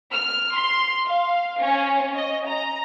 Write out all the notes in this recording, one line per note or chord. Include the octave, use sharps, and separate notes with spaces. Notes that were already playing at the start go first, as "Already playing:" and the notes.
F6
C6
F5
C#4
D#5
A#5